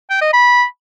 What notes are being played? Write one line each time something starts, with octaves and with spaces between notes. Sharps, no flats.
G5
D#5
B5